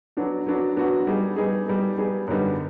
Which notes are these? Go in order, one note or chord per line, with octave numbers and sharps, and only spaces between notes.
F#3 B3 D4 F#4
F#3 B3 D4 F#4
F#3 B3 D4 F#4
G3 B3 D#4 G#4
G3 B3 D#4 G#4
G3 B3 D#4 G#4
G3 B3 D#4 G#4
F#2 D3 G3 B3 D#4